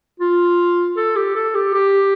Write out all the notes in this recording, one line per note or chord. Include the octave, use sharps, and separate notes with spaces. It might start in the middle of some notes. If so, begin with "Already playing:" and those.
F4
A4
G4
A4
G4
G4